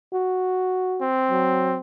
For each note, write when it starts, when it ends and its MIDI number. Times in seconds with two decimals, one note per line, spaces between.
0.13 1.07 66
1.02 1.80 60
1.30 1.77 54